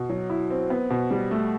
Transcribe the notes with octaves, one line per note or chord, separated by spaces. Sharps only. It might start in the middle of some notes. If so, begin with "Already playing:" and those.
Already playing: B2
F#3
E4
C4
B3
B2
G3
A3